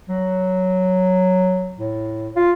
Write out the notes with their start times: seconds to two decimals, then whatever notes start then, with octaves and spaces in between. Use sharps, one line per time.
0.09 F#3
1.78 A2
2.36 F4